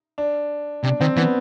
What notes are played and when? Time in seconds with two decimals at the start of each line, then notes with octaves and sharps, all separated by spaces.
0.18 D4
0.84 C3 D4
1.01 D#3 C4
1.17 E3 B3